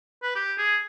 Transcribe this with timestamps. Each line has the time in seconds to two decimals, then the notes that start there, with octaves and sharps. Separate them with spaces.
0.23 B4
0.36 G4
0.58 G#4